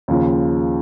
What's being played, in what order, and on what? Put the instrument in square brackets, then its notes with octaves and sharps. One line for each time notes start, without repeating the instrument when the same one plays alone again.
[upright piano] D#2 C#3 F3